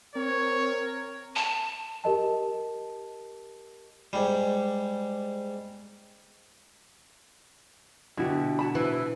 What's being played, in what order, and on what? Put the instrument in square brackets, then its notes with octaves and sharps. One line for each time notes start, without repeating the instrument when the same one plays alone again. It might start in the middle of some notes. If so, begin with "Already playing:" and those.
[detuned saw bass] C4 [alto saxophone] A#4 [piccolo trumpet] C#5
[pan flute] A5
[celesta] G4 A#4 D#5 A5
[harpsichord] G#2 G3
[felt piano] B2 D3 [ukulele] E4 F#4 G4
[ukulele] F#4 A5 B5
[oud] E3